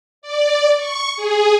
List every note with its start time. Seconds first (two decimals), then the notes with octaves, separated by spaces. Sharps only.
0.22 D5
0.77 C#6
1.16 G#4